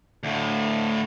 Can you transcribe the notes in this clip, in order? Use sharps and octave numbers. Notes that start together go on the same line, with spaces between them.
D2 A2